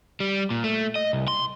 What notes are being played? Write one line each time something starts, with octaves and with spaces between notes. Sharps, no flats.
G3
A#2
A3
D#5
C2
C6